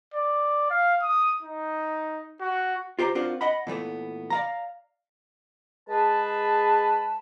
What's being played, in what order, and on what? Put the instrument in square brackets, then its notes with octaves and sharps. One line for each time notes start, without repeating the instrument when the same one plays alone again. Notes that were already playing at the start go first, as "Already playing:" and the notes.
[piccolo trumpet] D5
F5
D#6
D#4
F#4
[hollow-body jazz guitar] F4 G4 C5 A#5
C4 D4 F4 F#4 A#4 C5
D#5 F#5 B5
A#2 E3 A3 B3
D5 F5 A#5
[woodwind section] G#3 G#4 B4 A5